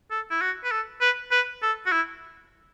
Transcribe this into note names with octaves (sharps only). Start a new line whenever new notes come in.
A4
E4
F#4
B4
A4
B4
B4
A4
F#4
E4